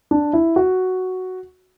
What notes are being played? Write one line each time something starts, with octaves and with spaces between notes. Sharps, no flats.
D4
E4
F#4